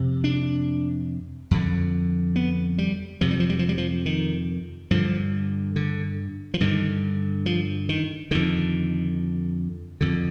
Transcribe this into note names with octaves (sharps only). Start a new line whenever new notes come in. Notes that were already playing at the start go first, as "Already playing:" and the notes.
Already playing: F2 C3
D4
F2 D3
B3
G3
F2 C3 F3
G3
F3
G3
F3
G3
F3
D#3
G2 D3 F3
D3
F3
G2 D3 D#3
F3
D#3
F2 D3 D#3
F2 D3